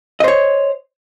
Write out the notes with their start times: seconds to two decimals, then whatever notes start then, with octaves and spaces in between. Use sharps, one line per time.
0.20 D#5
0.24 C5
0.28 C#5